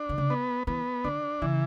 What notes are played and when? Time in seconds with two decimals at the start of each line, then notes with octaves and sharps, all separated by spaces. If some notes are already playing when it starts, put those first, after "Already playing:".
Already playing: D4
0.09 D3
0.18 C#3
0.30 B3
0.67 E3 B3
1.04 D3 D4
1.42 C#3 E3